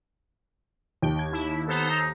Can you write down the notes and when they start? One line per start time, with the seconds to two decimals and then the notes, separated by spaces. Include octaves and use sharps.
1.02 D#2 G5
1.19 G#6
1.33 E4
1.68 B3 A4 C5 A#5
1.89 D#4